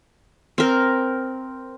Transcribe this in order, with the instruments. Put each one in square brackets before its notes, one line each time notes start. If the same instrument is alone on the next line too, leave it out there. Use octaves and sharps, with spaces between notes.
[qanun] C4 A#4